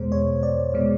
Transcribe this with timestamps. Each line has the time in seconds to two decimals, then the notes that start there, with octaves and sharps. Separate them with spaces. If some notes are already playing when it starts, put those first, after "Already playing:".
Already playing: E2 B2 G#3 C5
0.12 C#5
0.43 D5
0.74 B2 G#3